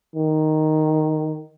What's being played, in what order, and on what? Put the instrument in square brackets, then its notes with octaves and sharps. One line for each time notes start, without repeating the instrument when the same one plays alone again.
[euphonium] D#3